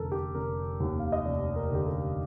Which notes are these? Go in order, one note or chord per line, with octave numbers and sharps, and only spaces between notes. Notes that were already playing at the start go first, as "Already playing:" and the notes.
Already playing: F1 D3 A4 A#4
G4
F1 A#4
D#2
F5
D#5
F1 D5
A#4
D3 G4
A4